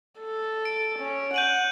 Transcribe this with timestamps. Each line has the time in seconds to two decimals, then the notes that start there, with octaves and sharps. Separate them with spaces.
0.21 A4
0.65 D7
0.99 C#4
1.34 F#5 G6 D#7 F#7